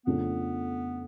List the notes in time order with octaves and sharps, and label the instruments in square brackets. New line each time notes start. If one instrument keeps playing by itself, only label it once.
[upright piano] F2 C#3 F3 A3 D4 [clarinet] B3